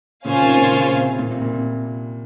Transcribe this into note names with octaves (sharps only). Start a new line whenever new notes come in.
A#2 C#3 C#4 F4 C5 F5 G#5
C3 D#3
A#2 C#3
A#2 C#3
C3
A#2
C3
A#2
C3